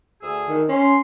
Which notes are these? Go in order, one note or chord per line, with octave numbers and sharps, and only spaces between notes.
D2 G#4 E6
D#3
C#4 C6